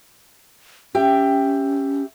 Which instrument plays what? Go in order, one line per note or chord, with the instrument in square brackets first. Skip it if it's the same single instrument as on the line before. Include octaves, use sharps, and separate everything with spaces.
[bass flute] C#4 [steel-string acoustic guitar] G4 E5 G5